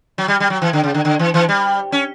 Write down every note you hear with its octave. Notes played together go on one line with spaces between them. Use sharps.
F#3
G3
G3
F#3
E3
D3
C#3
D3
D3
E3
E3
G3
C#4